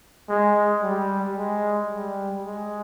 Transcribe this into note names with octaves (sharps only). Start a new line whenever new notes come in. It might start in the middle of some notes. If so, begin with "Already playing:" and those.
G#3
G3
G#3
G3
G#3